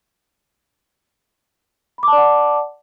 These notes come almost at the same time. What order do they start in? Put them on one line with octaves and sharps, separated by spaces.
B5 D6 A5 D5 F#5